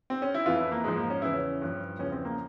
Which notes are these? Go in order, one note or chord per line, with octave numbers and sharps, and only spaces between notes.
C4
C#4
E4
F2 E3 F4
E4
A#3
G#2 F3 G#3
A#3
C#4
E2 C#3 E3 E4
C#4
G2 F3
E2 C#3 F3 C#4
C4
A#3